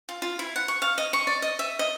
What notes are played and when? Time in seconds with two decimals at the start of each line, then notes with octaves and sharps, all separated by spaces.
0.09 F4
0.22 F4
0.39 E4
0.56 F#5
0.68 C#6
0.82 F5
0.98 D#5
1.13 C#6
1.27 D5
1.42 D#5
1.59 E5
1.79 D#5